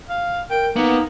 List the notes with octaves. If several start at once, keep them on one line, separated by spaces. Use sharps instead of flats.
F5
A#4 G5
A#3 B3 D#4